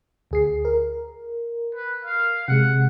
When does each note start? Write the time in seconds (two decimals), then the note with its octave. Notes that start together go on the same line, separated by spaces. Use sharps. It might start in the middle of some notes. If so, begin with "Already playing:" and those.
0.31 D2 G#4 C7
0.65 A#4
1.75 B4
2.05 F5
2.48 C3 G#3 F#5